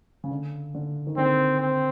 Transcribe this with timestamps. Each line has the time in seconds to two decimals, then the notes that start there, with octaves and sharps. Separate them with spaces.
0.24 C#3
0.31 D3
0.74 D3
1.07 D#3
1.17 D3 C4
1.61 C4